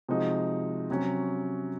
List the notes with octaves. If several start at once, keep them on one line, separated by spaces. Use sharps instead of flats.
C3 F3 G#3 D#4 F#4
C3 F#3 C#4